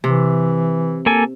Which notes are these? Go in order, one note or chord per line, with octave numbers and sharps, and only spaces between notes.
C3 E3
A#3 A4 G#5